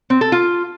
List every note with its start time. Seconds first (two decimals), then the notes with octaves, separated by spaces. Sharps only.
0.10 C4
0.21 A4
0.32 F4